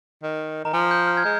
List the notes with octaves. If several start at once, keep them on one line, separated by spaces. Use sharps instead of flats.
D#3
D#3 A#5
F3 G#5
G6
F6
G#6
G#3 G6